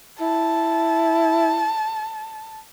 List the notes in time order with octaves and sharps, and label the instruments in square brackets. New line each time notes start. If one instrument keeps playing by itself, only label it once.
[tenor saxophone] E4 [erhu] A5